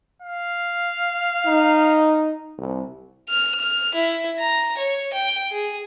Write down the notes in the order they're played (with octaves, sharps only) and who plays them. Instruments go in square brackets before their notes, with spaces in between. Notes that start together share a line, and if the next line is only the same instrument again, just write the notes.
[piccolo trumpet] F5
[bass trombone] D#4
C2
[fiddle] F6
F6
E4
A#5
C#5
G5
G#4